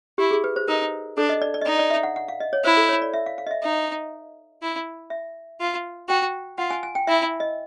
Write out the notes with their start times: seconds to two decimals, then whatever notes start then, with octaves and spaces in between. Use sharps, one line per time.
0.18 E4 G4
0.31 G#4
0.44 B4
0.56 C5
0.68 D#4 A#4
1.17 D4 A4
1.29 D#5
1.42 D5
1.54 D5
1.61 D#5
1.66 D#4 D5
1.79 D5
1.90 E5
2.03 F#5
2.16 F#5
2.28 F5
2.40 D#5
2.53 C#5
2.64 E4 C5
2.77 A4
2.89 C#5
3.02 D5
3.14 E5
3.26 F5
3.38 F5
3.47 D#5
3.51 E5
3.63 D#4 E5
4.62 E4
5.10 E5
5.60 F4
6.09 F#4 G5
6.58 F4 F#5
6.70 G#5
6.83 G#5
6.95 G5
7.07 E4 E5
7.40 D#5